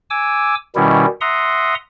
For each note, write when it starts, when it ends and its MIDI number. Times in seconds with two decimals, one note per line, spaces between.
0.10 0.55 80
0.10 0.55 86
0.10 0.55 88
0.76 1.06 47
0.76 1.06 51
0.76 1.06 55
0.76 1.06 61
0.76 1.06 64
1.21 1.75 76
1.21 1.75 78
1.21 1.75 82
1.21 1.75 84
1.21 1.75 87